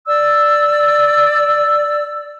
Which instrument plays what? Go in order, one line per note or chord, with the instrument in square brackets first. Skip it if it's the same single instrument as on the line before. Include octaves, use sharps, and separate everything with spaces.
[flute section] D5 E6